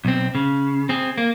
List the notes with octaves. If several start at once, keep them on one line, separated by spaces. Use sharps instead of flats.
B1 C4
C#3
C4 G#4
A#3